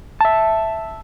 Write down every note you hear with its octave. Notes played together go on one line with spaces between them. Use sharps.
E5 A5